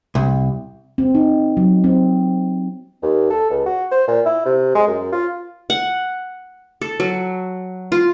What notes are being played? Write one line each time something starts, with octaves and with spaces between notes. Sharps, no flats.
C2
C4
D#4
F#3
C4
D#2
A4
C#2
F#4
C5
A#2
E4
C3
G#3
F#2
F4
F#5
A4
F#3
F4